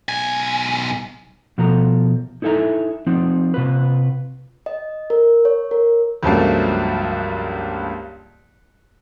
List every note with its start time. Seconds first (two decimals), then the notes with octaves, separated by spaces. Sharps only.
0.09 B1 G#5
1.58 B2 F3 A4 A#5
2.42 D#4 E4 A4 E5 G#5 A#5
3.07 F3 C4 D#4
3.54 C3 F4 B4
4.66 D#5
5.10 A#4
5.45 C#5
5.71 A#4
6.23 C#2 G2 F3 F#3 A3 A#3